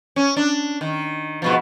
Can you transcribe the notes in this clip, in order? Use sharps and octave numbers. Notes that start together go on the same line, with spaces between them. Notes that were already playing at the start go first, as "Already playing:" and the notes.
C#4
D4
D#3
G#2 B2 F3